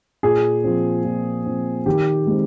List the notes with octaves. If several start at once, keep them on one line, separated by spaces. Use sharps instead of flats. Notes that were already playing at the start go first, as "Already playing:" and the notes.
A#2 G#4
F3 C4
A#2
F3 C4
D#3 G4
G#3 C4